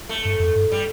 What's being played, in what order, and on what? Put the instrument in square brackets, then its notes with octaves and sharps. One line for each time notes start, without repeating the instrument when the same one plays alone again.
[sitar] A3
[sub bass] G2
F2
G2
[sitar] G3